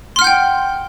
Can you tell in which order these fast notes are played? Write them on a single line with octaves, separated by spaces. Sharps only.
C6 F6 F#5 G6 G5